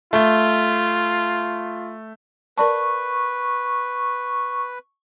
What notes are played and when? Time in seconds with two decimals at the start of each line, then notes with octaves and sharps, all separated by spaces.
0.13 A3 F4
2.58 A#4 B4 D5 A5 C#6